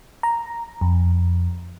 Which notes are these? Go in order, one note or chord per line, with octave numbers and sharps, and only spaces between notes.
A#5
F2